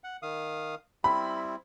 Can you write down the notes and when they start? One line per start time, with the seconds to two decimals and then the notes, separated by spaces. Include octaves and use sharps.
0.04 F#5
0.22 D#3 F5 D#6
1.04 G3 C4 E4 B5